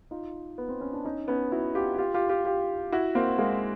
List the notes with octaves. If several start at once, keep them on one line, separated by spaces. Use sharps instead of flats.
D#4 F4
B3
C4
C#4
D4
C#4 D#4
B3 C#4
E4 F#4
F4 G4
F4 G4
F4 G4
F4 G4
F4 G4
E4 F#4
A#3 C4
G#3 A#3